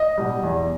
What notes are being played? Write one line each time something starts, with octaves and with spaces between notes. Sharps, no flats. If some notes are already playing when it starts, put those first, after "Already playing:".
Already playing: D#5
B2 G3
E2